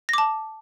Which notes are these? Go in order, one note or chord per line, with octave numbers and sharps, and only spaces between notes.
A5 D6 A#6